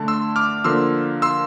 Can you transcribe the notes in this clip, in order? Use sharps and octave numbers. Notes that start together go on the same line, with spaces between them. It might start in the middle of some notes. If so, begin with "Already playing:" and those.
Already playing: D3 A3 A5
C6 E6
D6 F6
D3 F3 A#3 C6 E6
C6 E6